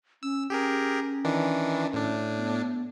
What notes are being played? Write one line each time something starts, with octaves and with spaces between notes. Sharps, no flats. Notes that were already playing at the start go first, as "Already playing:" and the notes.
C#4 E6
C#4 G4 G#4 A#4
D#3 E3 D4
A2 D4
B3